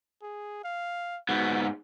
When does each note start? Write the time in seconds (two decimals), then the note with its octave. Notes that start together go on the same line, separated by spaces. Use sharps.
0.22 G#4
0.64 F5
1.29 G#2 B3 F#4